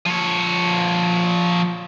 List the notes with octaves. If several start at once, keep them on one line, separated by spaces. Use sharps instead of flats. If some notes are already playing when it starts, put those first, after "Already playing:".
F3 C#5